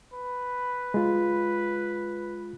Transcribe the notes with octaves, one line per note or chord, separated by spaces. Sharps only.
B4
G#3 F4